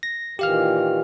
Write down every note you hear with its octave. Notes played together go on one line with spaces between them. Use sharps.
A#6
A#2 D#3 E3 G4 F5 F6